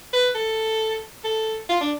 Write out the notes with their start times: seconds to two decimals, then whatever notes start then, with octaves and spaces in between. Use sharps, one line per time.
0.13 B4
0.35 A4
1.24 A4
1.69 F4
1.81 D4